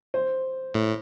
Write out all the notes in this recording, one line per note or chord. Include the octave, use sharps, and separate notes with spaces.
C5
A2